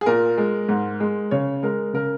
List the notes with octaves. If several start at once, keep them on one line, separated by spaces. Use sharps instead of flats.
G#4
A#2 A#4
G#3
G#2
G#3
C#3 C#5
G#3 A#4
C#3 A#4